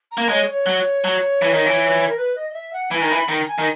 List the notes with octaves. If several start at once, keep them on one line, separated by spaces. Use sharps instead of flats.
A#5
A#3
G#3 C#5
C#5
F#3
F#3
E3
D#3
E3
A#4
B4
D#5
D#5
E5
F#5
E3 G#5
D#3
E3 B5
D#3 A#5
G#5
D#3